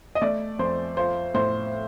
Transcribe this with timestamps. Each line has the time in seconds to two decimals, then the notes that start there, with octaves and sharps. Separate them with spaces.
0.15 D#5
0.21 A3 D5
0.59 F2 C5
0.97 F4 C5
1.34 A2 C5